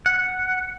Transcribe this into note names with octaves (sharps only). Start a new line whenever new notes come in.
F#5